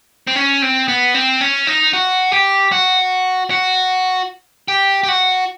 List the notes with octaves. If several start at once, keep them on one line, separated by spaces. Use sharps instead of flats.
C4
C#4
C4
B3
C4
C#4
D#4
F#4
G4
F#4
F#4
G4
G4
F#4